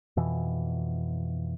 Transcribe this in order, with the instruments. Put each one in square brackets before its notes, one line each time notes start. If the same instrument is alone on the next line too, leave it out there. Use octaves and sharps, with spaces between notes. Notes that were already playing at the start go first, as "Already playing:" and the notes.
[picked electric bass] F2 B2 E3